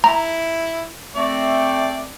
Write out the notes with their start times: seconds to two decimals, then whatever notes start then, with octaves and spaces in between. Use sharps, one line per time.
0.04 E4 A#5
1.16 A3 C4 D5